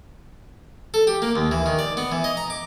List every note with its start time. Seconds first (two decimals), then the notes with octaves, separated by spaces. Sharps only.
0.94 A4
1.07 G4
1.22 A#3
1.36 D#2
1.51 E3
1.66 D#3
1.79 D5
1.97 B3
2.12 E3
2.24 D#5
2.37 A#5
2.50 D6